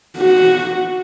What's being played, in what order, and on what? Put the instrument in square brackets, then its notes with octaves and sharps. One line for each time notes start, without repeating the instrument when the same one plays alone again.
[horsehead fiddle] F#4